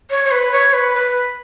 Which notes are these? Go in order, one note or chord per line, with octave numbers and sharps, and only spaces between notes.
C#5
C#5
B4
C#5
B4
B4